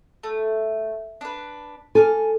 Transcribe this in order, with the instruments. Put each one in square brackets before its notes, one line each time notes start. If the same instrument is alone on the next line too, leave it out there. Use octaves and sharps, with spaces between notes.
[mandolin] A3
D4 B4
[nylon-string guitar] A4 [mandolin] G#5 D6 F6